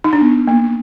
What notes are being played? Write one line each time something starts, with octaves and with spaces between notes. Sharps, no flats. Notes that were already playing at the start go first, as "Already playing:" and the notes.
D#4
D4
B3
A#3